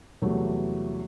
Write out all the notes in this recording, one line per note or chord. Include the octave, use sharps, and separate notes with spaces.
E2 C3 E3 F#3 G3 A3